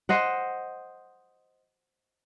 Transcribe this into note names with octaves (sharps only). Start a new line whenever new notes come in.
C5 D#5 F#5